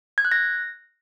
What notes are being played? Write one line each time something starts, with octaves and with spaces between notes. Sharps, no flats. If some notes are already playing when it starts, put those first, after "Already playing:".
G#6
F#6
A#6